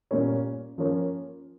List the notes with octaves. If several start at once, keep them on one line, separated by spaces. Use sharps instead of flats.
A#2 G3 A#3 C#4
F3 A#3 C#4